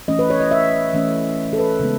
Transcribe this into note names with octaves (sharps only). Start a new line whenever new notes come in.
E3 A3 C#4 D#5
B4
C#5
D#5
E5
E3 A3 C#4
A4
B4
C#3 G#3 B3